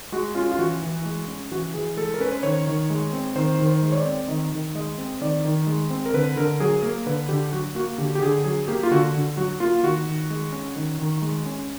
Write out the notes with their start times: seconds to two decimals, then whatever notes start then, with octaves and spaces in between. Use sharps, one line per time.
0.12 G#3 F#4
0.35 C#4 F4
0.52 F4
0.59 E3 F#4
0.82 E3
1.05 G#3
1.27 C#4
1.52 E3 F#4
1.74 E3 G#4
1.97 G#3 A4
2.14 A#4
2.20 C#4 B4
2.32 C5
2.43 D#3 C#5
2.67 D#3
2.90 G#3
3.13 C4
3.36 D#3 C5
3.59 D#3
3.67 C5
3.82 G#3
3.92 C#5
3.97 D5
4.06 C4
4.28 D#3 D#5
4.52 D#3
4.75 G#3 D#5
4.98 C4
5.21 D#3 D5
5.45 D#3
5.67 G#3
5.90 C4
6.06 A#4
6.13 D3 B4
6.36 D3 A#4
6.60 F#3 G#4
6.82 A#3 A#4
7.06 D3 B4
7.29 D3 G4
7.53 F#3 F#4
7.75 A#3 F#4
7.98 D3 G4
8.15 G4
8.22 D3 G#4
8.44 F#3 G#4
8.68 A#3 G4
8.83 F4
8.91 D3 F#4
9.14 D3
9.37 F#3 F#4
9.60 A#3 F4
9.83 D#3 F#4
10.06 D#3
10.30 G#3
10.52 C#4
10.76 D#3
10.99 D#3
11.22 G#3
11.46 C#4